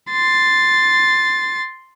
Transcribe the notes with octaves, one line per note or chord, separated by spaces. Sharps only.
C6 A6